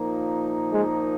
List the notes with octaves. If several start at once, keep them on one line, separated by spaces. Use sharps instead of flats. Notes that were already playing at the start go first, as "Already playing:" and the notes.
Already playing: A#2 F3 A#3 D#4
G#3